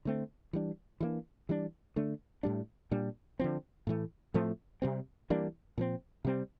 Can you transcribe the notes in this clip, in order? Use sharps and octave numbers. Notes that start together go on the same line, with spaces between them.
D3 A3 C4
E3 G3 D4
E3 G3 A#3 D4
E3 G3 D4
D3 A3 D4
A2 G3 D4
A#2 G3 D4
D3 F3 C4
A2 E3 A3
A2 F3 A3 C4
C3 G3 C4
E3 G3 A#3 D4
A#2 F3 C4
C3 G3 C4